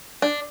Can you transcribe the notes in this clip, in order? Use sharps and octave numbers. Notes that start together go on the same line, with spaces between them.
D4